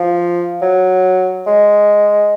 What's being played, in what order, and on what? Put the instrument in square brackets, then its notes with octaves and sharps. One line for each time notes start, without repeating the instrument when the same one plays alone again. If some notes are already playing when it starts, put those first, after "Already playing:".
Already playing: [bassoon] F3
F#3
G#3